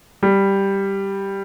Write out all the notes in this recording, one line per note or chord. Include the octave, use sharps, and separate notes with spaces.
G3